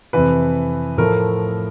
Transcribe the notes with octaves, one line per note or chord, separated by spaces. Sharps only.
F2 C3 E3 B4
A2 F3 A3 A#4